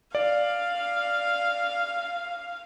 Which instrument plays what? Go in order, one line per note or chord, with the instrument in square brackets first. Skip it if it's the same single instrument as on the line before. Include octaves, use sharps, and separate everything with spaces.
[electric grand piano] D5 [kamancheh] F5